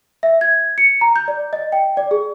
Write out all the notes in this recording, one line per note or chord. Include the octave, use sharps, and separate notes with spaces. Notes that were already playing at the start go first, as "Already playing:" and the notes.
E5
G#6
C#7
A#5
G6
D5
D#5
G5
D5
G#4